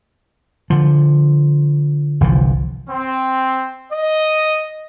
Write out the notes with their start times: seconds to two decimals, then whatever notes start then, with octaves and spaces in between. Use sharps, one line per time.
0.70 D3 F3
2.21 G1 C2 E3 F3
2.88 C4
3.92 D#5